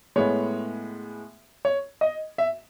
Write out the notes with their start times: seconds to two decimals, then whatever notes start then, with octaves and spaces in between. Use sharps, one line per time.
0.16 A2 G#3 B3 C#5
1.65 C#5
2.01 D#5
2.38 E5